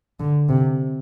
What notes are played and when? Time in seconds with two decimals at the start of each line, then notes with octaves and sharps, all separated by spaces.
0.20 D3
0.49 C3